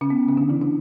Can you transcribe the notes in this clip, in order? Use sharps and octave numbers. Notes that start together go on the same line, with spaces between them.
C#3 C#4
B3
C#3 C#4
D3 D4
E3 E4
D3 D4